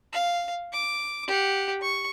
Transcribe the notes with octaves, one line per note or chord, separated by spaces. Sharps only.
F5
D6
G4 F#5
C#6